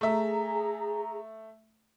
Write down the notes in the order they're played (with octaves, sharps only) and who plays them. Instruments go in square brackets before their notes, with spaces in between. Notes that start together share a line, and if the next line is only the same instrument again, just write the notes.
[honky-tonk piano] A3 E5 [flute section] G#4 A#5